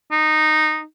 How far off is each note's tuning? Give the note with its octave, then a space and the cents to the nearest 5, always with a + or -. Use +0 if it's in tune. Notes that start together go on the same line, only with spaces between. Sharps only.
D#4 -10